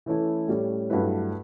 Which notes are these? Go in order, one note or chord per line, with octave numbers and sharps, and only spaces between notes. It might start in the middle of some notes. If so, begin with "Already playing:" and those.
E3 A3 C#4 E4
A2 G3 C#4
G2 F#3 A3 E4 B4